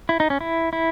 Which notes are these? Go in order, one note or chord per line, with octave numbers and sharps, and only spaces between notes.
E4
D#4
C#4
E4
E4